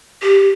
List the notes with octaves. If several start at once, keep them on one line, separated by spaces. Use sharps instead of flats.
G4